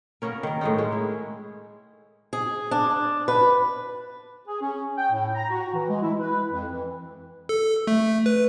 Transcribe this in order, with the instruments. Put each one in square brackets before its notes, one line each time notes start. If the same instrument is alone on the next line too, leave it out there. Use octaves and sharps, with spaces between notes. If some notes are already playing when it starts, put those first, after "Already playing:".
[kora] A#3 B3 C#4 A#4
D#3 A#4
A2 G#3 D#4
G#3 C#4
E4
[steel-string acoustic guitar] G#4
D4
B4
[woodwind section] G#4
C#4
G5
A2
A#5
F#4
E3
G#3
E4
B4
F2
E3
[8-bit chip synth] A4
A3
B4